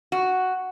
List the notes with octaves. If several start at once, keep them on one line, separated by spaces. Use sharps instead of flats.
F#4